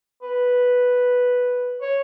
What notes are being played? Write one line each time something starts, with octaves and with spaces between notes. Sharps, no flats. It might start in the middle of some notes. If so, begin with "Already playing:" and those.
B4
C#5